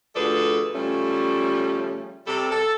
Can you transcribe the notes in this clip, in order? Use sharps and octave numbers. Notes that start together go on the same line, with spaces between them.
D2 F3 G#4 A4 B4 D5
C#3 F3 G3 A3 C#4
C3 G3 G4 A4
A4